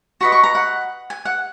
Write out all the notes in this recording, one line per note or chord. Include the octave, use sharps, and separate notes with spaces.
F#4 B4 D#5 C#6
C#6
A#5
F#5
G#5
F#5